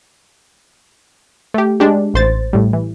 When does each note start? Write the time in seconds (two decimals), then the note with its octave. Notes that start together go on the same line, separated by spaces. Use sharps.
1.54 A3 G4
1.80 G#3 D4 G4
2.14 A1 C5 A6
2.53 A2 G3
2.73 E3